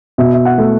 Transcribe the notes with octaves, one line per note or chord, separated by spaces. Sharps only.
B2 E5
E5
F#5
A3